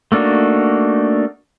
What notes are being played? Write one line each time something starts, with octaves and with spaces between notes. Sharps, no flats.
A3 A#3 D4 D#4 F#4